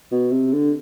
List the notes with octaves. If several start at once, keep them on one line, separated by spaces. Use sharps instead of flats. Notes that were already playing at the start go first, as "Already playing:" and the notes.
B2
C3
D3